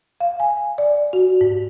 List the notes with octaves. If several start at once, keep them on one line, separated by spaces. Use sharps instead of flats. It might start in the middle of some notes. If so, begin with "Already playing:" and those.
F5
G#5
D5
F#4
G#2